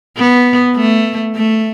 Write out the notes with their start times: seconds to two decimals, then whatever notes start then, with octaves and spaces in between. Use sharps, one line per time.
0.17 B3
0.76 A3
1.36 A3